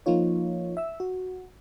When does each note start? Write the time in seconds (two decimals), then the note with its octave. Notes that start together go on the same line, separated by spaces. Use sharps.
0.06 F3 A#3 D#4 F4 C#5
0.77 E5 E6
1.00 F#4